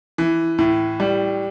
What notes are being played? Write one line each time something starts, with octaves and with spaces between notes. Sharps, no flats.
E3
A2
G3